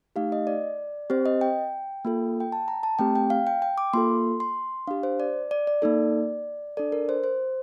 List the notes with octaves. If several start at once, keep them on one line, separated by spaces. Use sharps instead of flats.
A3 D#4 G4 F5
D#5
D5
C4 G4 C5
D#5
G5
A#3 F4 A4
G5
A5
A#5
A5
A3 C4 G4 G5
G5
F5
G5
G5
D6
A#3 F4 A4 C6
C6
D4 G4 F5
C5
D5
D5
D5
A#3 D#4 A4
D4 A4 D5
A#4
C5
C5